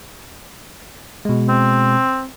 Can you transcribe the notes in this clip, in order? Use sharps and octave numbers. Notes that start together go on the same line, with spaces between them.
B2 G#3
C4